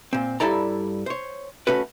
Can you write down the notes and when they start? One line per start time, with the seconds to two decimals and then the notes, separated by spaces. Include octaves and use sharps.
0.13 A#2 C4
0.40 G2 G3 E4 A4 D5 A#5
1.06 C5 C#5
1.67 A3 C#4 F#4 B4